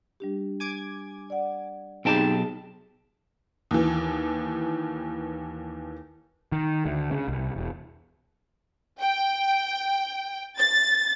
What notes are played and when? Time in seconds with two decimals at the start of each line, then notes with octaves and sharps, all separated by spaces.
0.20 G3 D4 G4
0.60 G#5 D6 G#6
1.30 D5 F#5
2.05 B1 C4 D#4 G4 G#4 G5 A5
3.71 D#2 E3
6.52 D#3
6.86 D2
7.11 C#3
7.28 C2
7.56 E1
9.01 G5
10.58 A6